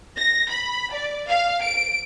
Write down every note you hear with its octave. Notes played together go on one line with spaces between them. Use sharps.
A#6
B5
D5
F5
D7